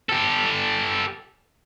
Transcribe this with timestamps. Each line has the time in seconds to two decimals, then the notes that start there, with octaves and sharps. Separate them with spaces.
0.09 G4 A4